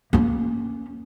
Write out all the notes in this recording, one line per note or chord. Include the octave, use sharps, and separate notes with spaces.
A#3 C#4